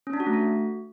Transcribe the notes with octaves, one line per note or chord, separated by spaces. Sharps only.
C#4
D4
F#4
A3
F#4